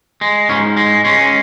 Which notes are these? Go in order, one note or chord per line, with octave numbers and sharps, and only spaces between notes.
G#3
G#2 C#4
G#3
G#3 C#4